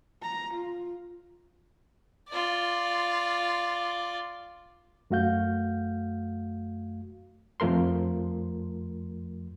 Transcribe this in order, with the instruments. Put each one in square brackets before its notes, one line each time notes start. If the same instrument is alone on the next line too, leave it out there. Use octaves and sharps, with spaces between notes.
[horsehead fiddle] A#5
F4
[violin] F4 D5
[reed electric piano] F#2 A3 F#4 F5 G6
F2 F3 A3 A#4 C6